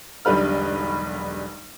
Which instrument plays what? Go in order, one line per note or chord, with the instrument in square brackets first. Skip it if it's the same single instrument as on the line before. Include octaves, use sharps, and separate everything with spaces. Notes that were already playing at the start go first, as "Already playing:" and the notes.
[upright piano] E1 B1 D3 G3 B4 F6